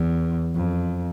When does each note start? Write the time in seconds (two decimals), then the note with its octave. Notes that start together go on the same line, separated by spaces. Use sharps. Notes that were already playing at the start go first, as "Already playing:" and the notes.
Already playing: E2
0.55 F2